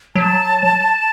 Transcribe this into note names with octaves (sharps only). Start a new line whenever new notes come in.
F#3 A5